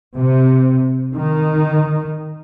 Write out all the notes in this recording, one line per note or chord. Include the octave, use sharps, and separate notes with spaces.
C3
D#3